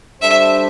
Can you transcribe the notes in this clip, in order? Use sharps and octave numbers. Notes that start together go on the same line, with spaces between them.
G3 D4 A4 C5 E5